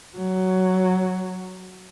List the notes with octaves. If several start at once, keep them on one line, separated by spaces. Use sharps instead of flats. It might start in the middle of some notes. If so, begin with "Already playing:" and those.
F#3